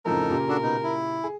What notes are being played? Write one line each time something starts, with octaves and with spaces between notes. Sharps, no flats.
F2 A2 C#3 D#4 A4 A#4
A#2 C#3 G4
D4 F#4 A4
B2 D#4
E4
G#4